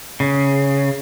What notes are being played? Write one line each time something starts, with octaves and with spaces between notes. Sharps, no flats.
C#3